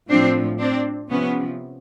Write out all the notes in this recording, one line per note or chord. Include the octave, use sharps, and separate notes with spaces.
A2 F3 C4 D4
C4 D4
C3 F3 B3 C#4